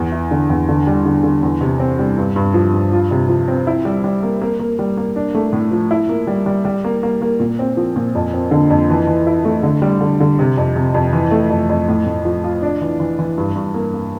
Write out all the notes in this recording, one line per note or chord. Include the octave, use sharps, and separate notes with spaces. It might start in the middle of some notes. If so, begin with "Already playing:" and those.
Already playing: E2
E4
D3
E2
D3
G3
D3
D3
E2
C3
C4
G3
G2
G2
F3
G2
F4
C3
F3
C4
E4
G3
G3
A#3
A#3
A#3
G3
A#3
D4
A3
A2
F3
E4
A#3
G3
G3
G3
A#3
A#3
A#3
A#2
C4
F3
A#2
F2
C4
D3
F2
E3
E3
E4
A3
D3
G3
D3
D3
C3
F2
C3
F2
E3
A3
F2
F2
A2
A2
F3
F4
D4
E3
E3
E3
G2
G2
A#3
A#3